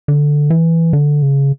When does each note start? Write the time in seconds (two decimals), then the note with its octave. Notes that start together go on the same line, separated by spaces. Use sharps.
0.08 D3
0.50 E3
0.93 D3
1.22 C#3